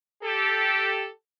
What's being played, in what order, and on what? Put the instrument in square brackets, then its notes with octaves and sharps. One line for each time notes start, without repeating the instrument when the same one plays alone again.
[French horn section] G4 A4